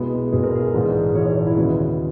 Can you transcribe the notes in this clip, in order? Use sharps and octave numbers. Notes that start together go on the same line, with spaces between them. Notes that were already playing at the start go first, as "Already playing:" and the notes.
Already playing: B1 B2 G#3 B3 E4
B1 B2 G#3 B3 G#4
A#4
G#4
A#1 G#2 E3
A#1 G#2 E3 C#5
C#5
C#5
E4
D#2 C#3 G#3 B3 F#4